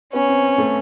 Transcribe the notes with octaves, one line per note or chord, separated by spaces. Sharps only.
B3 C#4
C4
A3